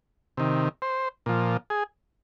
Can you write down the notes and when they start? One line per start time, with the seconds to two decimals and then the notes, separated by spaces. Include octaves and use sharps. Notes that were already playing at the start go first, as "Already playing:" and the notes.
0.37 C3 D#3
0.82 C5
1.26 A#2 F3
1.70 G#4